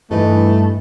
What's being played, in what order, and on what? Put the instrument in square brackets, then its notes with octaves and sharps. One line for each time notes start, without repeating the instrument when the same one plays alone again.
[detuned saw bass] G2 [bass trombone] E3 [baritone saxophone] A3 [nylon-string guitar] D#4 B4 D#5